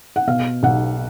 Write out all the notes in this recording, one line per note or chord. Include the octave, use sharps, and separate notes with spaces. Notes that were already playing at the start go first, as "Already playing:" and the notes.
F#5
B2 F5
B1 F#5